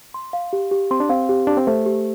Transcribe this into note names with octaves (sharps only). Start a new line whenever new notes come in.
C6
F5
G4
G4
C4 C6
D4
C4 F5
G4
D4 G4
C4
A3 C5
G4